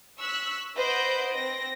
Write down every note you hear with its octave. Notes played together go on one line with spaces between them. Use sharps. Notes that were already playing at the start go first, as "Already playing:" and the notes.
C#6 E6 F#6 B6
B4 C5 D#5 F#5 G6 D7
C4 A#6